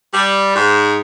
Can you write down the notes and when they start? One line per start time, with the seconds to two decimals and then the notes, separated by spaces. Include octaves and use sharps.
0.13 G3
0.55 G#2